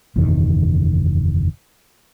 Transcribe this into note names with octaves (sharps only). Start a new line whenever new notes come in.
F#1 E2 B2 D#3